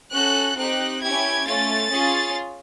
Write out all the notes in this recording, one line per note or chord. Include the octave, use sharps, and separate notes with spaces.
C#4 F#4 A4 F#6
C4 D#4 G4 F#6
C#4 E4 G4 G#6
A3 C#4 F4 A6
C#4 F4 G#4